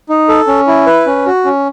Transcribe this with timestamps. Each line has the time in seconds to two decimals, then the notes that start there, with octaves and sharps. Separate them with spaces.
0.09 D#4
0.29 A4
0.47 C#4
0.67 E4
0.86 B4
1.06 C#4
1.26 F#4
1.45 C#4